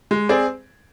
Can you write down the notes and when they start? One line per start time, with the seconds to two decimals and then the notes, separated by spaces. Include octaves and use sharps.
0.11 G#3
0.29 C4 G#4 D5